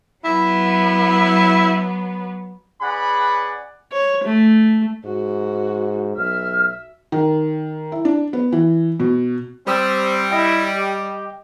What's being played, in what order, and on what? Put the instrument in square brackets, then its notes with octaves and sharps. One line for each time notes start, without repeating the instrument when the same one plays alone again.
[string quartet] F#3 B3 [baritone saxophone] E4
[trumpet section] C#4 G#4 B4 D5 F#5 B5
[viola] C#5
A3
[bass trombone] G#2 [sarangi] F#4
[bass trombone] B1 [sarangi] E5 [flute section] F6
[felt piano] D#3
E4
D4
B3
E3
B2
[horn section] G3 [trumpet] C4 [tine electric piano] C5 D#6 E6
[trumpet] E4 [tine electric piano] D#5 G5
[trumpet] G4